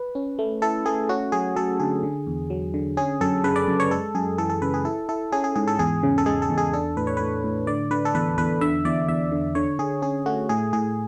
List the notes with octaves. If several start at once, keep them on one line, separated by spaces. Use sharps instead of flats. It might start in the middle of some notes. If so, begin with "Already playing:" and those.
Already playing: B4
C#4
A3
E4 A4
A3 G#4
C#4 F#4
F#3 G#4
F#3 A4
D3 G#4
D3
E2
F#3
D3
C#4 G#4
F#2 A4
C#3 B4
D5
F#2
C#5
G#3 A4
F#2 G#4
E3 A4
A4
C#3 B4
G#4
E4 A4
E4 A4
C#4 G#4
G#4
G#2 G#4
A4
E2 G#4
C#3
A4
G#3 G#4
A4
E2
G#4
D4 A4
A2 B4
C#5
A2 B4
A2
D3 D5
D3 B4
A4
E2 B4
E2 B4
D3 E5
E2 D5
E2 E5
D3
D3 C#5
D3 G#4
C#4 G#4
A3 F#4
A2 G#4
A2 G#4